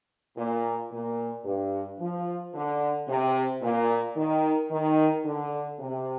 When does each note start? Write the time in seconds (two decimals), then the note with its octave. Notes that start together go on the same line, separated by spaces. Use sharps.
0.37 A#2
0.92 A#2
1.45 G2
2.00 F3
2.54 D3
3.08 C3
3.62 A#2
4.16 D#3
4.71 D#3
5.25 D3
5.80 C3